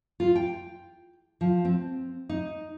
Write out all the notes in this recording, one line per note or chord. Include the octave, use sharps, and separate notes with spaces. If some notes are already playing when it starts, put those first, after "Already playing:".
F4
G5
F3
C4
D#4